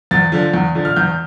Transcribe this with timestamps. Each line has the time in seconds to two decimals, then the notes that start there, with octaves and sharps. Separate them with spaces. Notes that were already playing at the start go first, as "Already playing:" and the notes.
0.11 E2 A6
0.32 D3 F3
0.54 E2
0.75 D3 F3
0.85 F6
0.96 E2 G6